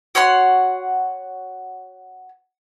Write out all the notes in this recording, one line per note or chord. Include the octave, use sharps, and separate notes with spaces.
F#4 C#5 F#5 C6